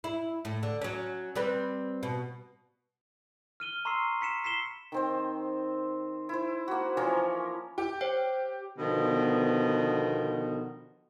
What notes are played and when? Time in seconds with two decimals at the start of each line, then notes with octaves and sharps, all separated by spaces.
0.04 E4
0.45 A2
0.63 D3
0.81 F#3 C#4
1.35 G3 C4 B4
2.03 B2
3.60 F6 D#7 G7
3.85 A#5 C6 C#6 E6 C7
4.21 B5 B6 C#7 E7
4.44 B6 C7 E7 G7
4.92 D#3 C4 C5
6.29 E4 C5
6.68 A#3 F#4
6.97 E3 F3 C#4 A#4
7.78 G4
8.01 C5 C#5 G5
8.79 B2 D3 D#3 F3 B3